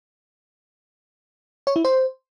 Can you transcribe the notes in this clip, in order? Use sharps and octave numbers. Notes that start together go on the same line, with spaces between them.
C#5
E4
C5